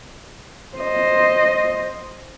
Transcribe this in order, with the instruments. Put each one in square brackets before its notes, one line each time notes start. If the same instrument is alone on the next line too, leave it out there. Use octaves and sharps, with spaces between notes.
[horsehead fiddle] C5 D#5